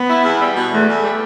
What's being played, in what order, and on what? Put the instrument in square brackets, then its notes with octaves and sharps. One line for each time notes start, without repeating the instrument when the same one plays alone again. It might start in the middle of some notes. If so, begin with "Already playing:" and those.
Already playing: [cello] B3
[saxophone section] E4
E2
G3
B2
[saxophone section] E2 [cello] A3
[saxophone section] E2
G3